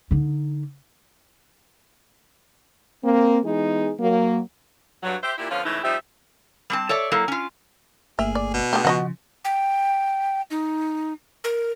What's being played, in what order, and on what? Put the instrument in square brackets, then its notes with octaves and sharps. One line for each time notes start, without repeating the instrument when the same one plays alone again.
[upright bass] D3 D#4
[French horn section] A#3 C4
E3 G#3 B3 D#4 G#4
F#3 A#3
[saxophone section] G2 F#3
G4 C5 E5
A#2 E4 G4
D3 F3 B3 C#4 F5
G#2 C#3 E3 A3 D#4 E4
F3 G3 C4 D#4 G4 E5
[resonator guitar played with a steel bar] G3 C4 A5
A4 C#5 D5 E5
F#3 A#3 E4 A4
C#4 F4
[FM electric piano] G1 A3 A#3 [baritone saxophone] G#4 [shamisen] E5
[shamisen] D5
[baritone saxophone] B2
[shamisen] G#3 D4 G4 [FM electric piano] A3
[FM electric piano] C#3 F3 [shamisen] F#4 D#5 F#5
[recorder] G5
D#4
A#4